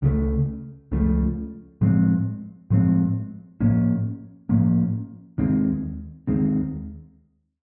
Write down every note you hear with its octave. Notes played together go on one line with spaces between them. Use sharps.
C#2 C#3 F3 A3
C#2 C#3 F3 A3
A2 F3 G#3 C4
A2 F3 G#3 C4
A2 F3 A#3 C#4
A2 F3 A#3 C#4
D#2 D#3 G#3 C4
D#2 D#3 G#3 C4